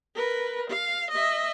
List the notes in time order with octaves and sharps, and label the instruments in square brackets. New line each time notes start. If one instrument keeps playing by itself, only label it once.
[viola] A#4 B4
F5
D#5 E5